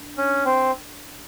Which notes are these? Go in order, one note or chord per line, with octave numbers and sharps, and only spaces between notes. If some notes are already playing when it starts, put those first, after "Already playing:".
Already playing: D4
C#4
C4